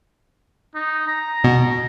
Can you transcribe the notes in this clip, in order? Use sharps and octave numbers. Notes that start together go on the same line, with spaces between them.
D#4
A#5
B2